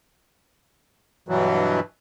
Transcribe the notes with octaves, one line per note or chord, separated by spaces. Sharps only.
G2 B2 E3 F#3